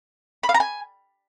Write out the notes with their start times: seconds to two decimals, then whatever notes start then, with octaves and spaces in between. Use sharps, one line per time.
0.43 B5
0.49 F5
0.54 A#5
0.60 G#5